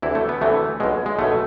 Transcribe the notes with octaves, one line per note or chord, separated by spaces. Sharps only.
D2 C3 E3 E4
A3
B3
D2 C3 E3 A3
B1 B2 G#3
G#3
B1 B2 A3